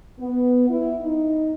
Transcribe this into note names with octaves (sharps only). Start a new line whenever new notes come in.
B3
E4
D#4